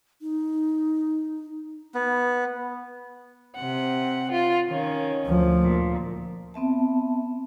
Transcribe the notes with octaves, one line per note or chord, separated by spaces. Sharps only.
D#4
B3
C3 F#5
F4
D#3 C#4
D2 F3
A#2
B3 C4 E5 A5